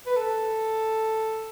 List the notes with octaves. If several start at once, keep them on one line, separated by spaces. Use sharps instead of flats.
B4
A4